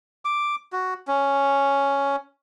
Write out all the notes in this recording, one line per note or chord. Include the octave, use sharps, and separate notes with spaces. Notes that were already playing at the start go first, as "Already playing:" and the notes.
D6
F#4
C#4